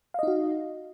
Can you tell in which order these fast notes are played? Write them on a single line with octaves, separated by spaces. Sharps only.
F5 D#5 D#4 F#4